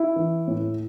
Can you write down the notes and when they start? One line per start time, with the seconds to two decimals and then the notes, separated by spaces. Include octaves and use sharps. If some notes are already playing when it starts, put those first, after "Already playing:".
Already playing: E4
0.16 E3
0.47 A2